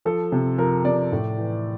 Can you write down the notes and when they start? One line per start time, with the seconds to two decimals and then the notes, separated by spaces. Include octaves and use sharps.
0.05 F3 A4
0.32 C3
0.58 F3 A#4
0.85 C3 D5
1.12 A2
1.38 E3